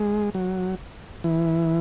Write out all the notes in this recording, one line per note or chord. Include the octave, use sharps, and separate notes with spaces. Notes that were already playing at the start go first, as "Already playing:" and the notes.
Already playing: G#3
F#3
E3